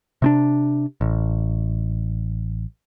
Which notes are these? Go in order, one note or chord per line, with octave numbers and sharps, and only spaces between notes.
C3 C4 D4
A1